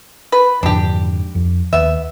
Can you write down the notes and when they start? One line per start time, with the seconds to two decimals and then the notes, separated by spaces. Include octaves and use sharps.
0.32 B4
0.63 F2 G#2 D3 D4 G4
1.35 F2
1.73 D#2 B3 E5